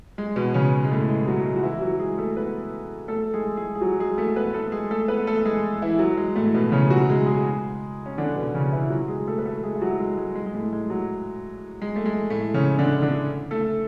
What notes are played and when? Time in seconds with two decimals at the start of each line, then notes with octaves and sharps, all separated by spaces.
0.18 G#3
0.36 B2 B3
0.54 C#3 C#4
0.84 G#3
0.91 A2 A3
1.09 G#3
1.28 F#3
1.46 G#3
1.56 F#4
1.63 E3 E4
1.81 F#3 F#4
1.99 G#3 G#4
2.18 A3 A4
2.36 B3 B4
3.08 A3 A4
3.34 G#3 G#4
3.57 G#3 G#4
3.75 G#4
3.81 F#3 F#4
3.99 G#3 G#4
4.17 A3 A4
4.36 B3 B4
4.54 A3 A4
4.72 G#3 G#4
4.91 A3 A4
5.08 B3 B4
5.27 A3 A4
5.45 G#3 G#4
5.82 E3 E4
5.99 F#3
6.17 G#3
6.36 A2 A3
6.54 B2 B3
6.72 C#3 C#4
6.90 F#3 F#4
7.09 G#3 G#4
7.27 G#3 G#4
8.06 C#4
8.18 D3 D4
8.35 B2 B3
8.54 C#3 C#4
8.73 E3 E4
8.90 F#3 F#4
9.08 G#3 G#4
9.27 A3 A4
9.38 B4
9.45 A3 A4
9.63 G#3 G#4
9.75 E4
9.81 F#3 F#4
10.00 G#3
10.17 G#3
10.35 G#3
10.46 G#3
10.54 A2 A3
10.73 G#3
10.90 F#3
11.82 G#3
11.96 A3
12.06 G#3
12.30 A2 A3
12.54 C#3 C#4
12.78 D3 D4
13.02 D3 D4
13.51 A3 A4